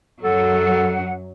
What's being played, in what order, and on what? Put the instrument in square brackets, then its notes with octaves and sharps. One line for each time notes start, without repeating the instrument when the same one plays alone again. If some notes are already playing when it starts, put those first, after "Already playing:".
[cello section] F#2 F#3 [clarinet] A4 [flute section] F#5